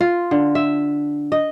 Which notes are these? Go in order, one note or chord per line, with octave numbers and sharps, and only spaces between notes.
F4
D3
E5
D#5